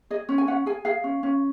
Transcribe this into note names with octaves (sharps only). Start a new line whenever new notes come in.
G#4 D#5
C#4
G#5
C#4 F#5
G#4 G#5
G#4 F5
C#4
C#4